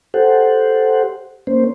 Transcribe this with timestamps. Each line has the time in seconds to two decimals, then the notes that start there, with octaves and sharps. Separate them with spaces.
0.14 G4 A4 C5 F#5
1.47 A#3 C#4 C5